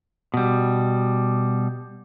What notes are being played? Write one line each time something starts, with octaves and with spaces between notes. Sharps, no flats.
B2 G3